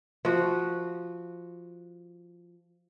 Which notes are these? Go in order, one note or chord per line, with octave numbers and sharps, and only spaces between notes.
F3 F#4